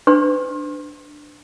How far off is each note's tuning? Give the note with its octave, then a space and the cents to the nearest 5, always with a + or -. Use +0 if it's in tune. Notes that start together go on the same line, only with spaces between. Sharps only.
D4 +10 B4 +40 C6 +40